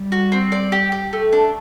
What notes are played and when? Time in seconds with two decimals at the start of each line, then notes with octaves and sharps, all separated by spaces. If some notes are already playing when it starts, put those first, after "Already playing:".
Already playing: G3
0.12 F#4
0.32 C4
0.52 D5
0.72 G4
0.92 G4
1.13 A3
1.33 D4